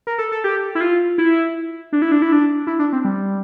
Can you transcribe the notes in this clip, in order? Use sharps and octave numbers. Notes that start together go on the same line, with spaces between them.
A#4
A4
A4
G4
E4
F4
E4
D4
E4
D4
E4
D4
E4
D4
C4
G3